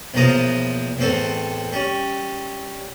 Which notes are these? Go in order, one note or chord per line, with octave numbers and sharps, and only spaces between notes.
B1 E2 F3 A#3 A#5 D#6
E2 A2 C4 A4
G3 C#4